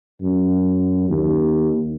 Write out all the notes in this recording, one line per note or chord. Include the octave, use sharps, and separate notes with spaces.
F#2
D#2